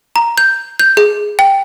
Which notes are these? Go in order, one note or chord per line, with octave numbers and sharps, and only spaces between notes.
A#5
G6
G6
G#4
G5